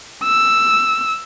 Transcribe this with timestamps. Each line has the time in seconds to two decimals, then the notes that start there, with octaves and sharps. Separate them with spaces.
0.24 E6